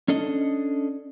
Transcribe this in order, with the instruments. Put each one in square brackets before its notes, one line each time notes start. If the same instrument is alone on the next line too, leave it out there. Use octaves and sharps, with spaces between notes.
[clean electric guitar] C#4 D4 A4 D#5